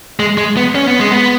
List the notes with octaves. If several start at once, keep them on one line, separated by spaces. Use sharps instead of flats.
G#3
G#3
B3
C#4
B3
G#3
B3